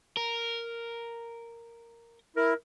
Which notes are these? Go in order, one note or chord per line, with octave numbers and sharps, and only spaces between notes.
A#4
E4 A#4